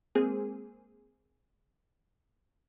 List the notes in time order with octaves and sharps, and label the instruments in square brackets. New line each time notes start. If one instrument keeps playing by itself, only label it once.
[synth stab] G#3 A#3 C4 G#4